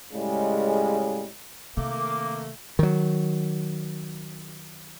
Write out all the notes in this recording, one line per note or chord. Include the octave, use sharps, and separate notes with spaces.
A2 C#3 G3 G#3
C3 D#3 A3 A#3 D6
D#3 F#3